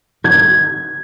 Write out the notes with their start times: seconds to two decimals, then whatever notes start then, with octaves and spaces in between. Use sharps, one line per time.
0.24 G#6